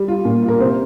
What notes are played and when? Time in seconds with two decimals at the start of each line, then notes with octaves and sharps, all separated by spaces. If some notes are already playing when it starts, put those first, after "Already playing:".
Already playing: G3
0.08 F4
0.25 A#2
0.42 F4
0.48 A#4
0.60 C3 C5